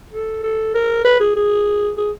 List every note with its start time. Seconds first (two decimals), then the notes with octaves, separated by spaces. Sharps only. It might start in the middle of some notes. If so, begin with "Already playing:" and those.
0.12 A4
0.43 A4
0.74 A#4
1.05 B4
1.20 G#4
1.36 G#4
1.97 G#4